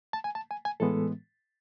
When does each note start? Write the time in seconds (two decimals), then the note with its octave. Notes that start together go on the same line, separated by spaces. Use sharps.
0.13 A5
0.24 G#5
0.35 A5
0.51 G#5
0.65 G#5
0.80 A2 E3 G#3 B3 A4